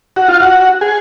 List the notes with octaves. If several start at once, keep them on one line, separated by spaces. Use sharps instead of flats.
F#4
F4
F#4
G#4